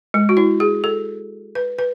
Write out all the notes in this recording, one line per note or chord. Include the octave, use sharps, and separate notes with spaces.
G#3
F#4
E4
G#4
A4
B4
B4